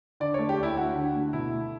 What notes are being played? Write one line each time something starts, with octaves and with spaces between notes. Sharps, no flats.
D3 D5
A3 C#5
G4
D2 E4
D2 F#4
D3
A3
B2 E4
A3